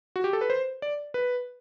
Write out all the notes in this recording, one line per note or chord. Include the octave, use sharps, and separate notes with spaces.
F#4
G4
A4
B4
C5
D5
B4